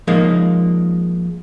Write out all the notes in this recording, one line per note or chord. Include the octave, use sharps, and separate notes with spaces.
F3 G#3 A#3 D#4